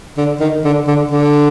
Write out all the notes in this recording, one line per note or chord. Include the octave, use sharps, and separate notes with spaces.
D3
D#3
D3
D3
D3